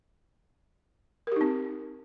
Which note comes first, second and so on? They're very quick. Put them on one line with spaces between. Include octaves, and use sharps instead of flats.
A#4 G4 D#4 C4